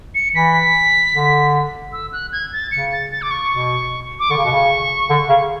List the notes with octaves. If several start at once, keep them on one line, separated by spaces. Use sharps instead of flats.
C#7
E3 B6
D3
E6
F#6
G#6
A6
C#3 C#7
A6
A6
D6
C#6
B2
D6
D3 C#6
C#3
B2
C#3
D3
C#3